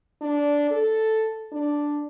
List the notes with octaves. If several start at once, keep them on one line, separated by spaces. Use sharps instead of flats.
D4
A4
D4